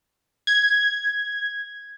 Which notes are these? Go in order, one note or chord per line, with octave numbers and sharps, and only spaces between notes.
G#6